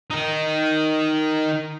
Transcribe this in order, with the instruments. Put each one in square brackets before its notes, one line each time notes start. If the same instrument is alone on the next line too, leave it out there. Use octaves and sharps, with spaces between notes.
[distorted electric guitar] D#3 D#4